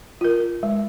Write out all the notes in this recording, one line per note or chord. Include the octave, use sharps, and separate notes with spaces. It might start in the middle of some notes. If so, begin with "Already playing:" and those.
F4 A#4
G#3